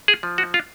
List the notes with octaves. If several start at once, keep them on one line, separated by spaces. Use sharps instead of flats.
G#4
F3
F#4
F4